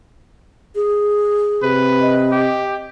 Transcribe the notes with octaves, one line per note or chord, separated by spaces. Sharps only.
G#4
C3 B4
D#5
G4